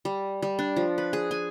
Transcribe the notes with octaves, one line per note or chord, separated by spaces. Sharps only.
G3
G3
D4
F3
B4
G#4
G#5